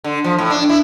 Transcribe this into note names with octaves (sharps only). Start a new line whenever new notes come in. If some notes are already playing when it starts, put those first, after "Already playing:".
D3
F3
A2
D4
E4